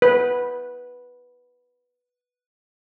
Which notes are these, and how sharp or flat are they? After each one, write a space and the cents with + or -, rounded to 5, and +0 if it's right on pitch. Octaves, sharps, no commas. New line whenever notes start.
B4 -5